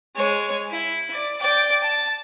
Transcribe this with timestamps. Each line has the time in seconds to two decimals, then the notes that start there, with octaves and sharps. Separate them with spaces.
0.16 G#3 C#5
0.71 E4
1.14 D5
1.42 D5 G5
1.83 A5